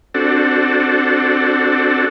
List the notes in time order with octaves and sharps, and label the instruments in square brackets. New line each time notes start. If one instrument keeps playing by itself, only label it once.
[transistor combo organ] C4 D4 F#4 A4